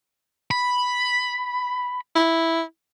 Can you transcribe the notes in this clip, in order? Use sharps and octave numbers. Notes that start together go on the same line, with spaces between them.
B5
E4